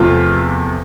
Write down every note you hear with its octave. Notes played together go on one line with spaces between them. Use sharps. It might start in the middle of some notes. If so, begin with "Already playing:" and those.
Already playing: E2 C3 F3 A3 F4